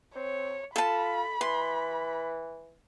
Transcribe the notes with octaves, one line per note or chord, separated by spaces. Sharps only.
C4 C#5
F4 A4 A5 B5
E3 C6